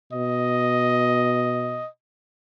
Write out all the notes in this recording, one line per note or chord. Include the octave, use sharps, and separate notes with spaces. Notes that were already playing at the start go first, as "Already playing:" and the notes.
B2 D#5